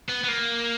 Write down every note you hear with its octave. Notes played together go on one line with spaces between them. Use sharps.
B3
B3
A#3